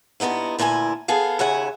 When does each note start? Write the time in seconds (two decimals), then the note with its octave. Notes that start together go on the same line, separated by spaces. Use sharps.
0.20 G2 A#2 B3 D#4 E4
0.59 D2 A#2 E4 G#4 G#5
1.08 B3 G#4 A4 F5
1.39 D#2 C#3 E5 F#5 G#5